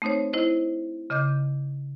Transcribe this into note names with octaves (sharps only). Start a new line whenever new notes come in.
A3 C4 D#4 C5 C#5
E4 C5 D#5
C#3 D#5 D6 G6